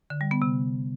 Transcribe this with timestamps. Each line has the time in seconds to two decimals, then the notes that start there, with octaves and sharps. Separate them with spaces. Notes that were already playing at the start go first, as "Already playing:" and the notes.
0.10 D3
0.21 G3
0.31 B3
0.42 C3